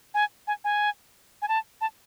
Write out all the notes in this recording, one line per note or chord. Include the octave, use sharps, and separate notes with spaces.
G#5
G#5
G#5
G#5
A5
A5